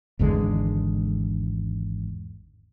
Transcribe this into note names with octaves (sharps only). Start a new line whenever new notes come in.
G#1 E2 D3 G#3